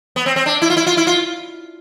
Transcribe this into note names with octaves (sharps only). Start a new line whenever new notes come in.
B3
C4
C4
D4
E4
F4
E4
F4
E4
F4